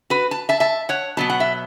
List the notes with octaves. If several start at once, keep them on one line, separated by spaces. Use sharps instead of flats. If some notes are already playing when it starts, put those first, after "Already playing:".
F#4 B4
A5
E5 A5
E5 A5
C#5 F#5
B2 F#3 B3 A5
F#5
E5